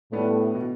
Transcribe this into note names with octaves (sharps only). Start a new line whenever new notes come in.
A2 G3 A3 B3 D4
B2